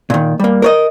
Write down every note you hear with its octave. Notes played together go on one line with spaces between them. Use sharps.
A#2 D#3
G3 A#3
A#4 C#5 D#5